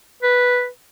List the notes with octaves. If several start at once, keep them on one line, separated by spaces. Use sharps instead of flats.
B4